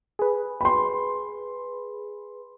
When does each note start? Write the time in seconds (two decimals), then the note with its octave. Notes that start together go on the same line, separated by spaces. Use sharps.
0.19 G#4 B4
0.61 B5 C6